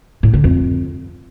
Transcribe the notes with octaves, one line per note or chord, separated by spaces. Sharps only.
A2
D3
F2